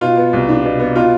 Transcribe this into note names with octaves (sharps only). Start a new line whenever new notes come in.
B2 F4
B3
C2
D4
B2
B3
B2 F4